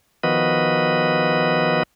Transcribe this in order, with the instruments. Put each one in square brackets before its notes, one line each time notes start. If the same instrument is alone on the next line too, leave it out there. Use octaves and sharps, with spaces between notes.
[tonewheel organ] D#3 F3 B3 F#4 B4 D#5